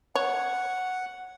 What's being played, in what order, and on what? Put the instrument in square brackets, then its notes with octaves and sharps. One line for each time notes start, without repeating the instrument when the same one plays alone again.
[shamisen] C#5 [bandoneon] F#5